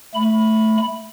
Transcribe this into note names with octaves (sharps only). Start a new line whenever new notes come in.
A3 B5